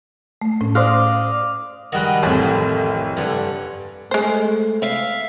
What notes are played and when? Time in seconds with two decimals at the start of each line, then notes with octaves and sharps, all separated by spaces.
0.42 A3
0.61 A2 C#4
0.75 C5 D5 D#5 F5 C6 F#6
1.92 D#3 G3 G#3 F#4 B4
2.23 A1 F2 A3
3.17 G2 D3 G#5
4.11 G#3 A3 C5
4.82 E5 F5